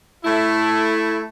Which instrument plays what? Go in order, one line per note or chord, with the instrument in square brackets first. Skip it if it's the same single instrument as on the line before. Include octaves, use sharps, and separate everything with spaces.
[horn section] A3 E4